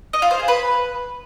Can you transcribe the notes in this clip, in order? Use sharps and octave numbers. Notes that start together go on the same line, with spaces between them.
D#5
F4
C5
G#4
B4